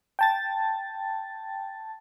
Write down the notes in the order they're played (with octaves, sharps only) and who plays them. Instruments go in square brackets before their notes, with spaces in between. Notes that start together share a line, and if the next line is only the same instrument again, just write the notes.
[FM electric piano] G5 A5 A6